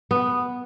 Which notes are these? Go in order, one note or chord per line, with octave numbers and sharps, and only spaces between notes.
B3